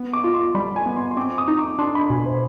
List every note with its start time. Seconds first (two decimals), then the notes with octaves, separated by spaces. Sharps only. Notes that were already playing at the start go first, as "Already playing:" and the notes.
Already playing: B3
0.13 D6
0.24 F4
0.34 C6
0.55 G3 B5
0.76 G#5
0.86 B3
0.96 C6
1.11 C6
1.17 C4 D6
1.38 D#6
1.48 D#4
1.59 D6
1.79 D4 C6
1.95 B5
2.10 B2 G#5
2.26 C5